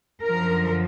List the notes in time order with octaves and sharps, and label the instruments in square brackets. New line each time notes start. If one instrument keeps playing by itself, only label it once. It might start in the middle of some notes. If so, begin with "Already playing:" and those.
[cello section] F#2 D3 F3 A#4